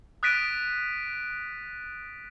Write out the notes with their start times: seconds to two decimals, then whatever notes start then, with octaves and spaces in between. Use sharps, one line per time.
0.23 D#6 F#6 A6 B6 D7 D#7